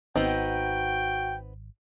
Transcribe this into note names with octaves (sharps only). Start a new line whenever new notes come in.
G#1 B3 C4 D#4 F#4 G5